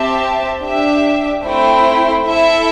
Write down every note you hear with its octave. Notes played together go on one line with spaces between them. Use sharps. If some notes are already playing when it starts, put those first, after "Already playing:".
Already playing: C4 G4 E5 A5
D4 G4 E5
A3 C4 E4 C5 G5
E4 A4 E5